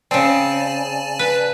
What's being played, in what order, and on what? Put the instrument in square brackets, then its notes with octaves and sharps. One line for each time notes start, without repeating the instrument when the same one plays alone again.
[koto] C#3 C4 [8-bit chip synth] D5 G#5 A5
[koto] B4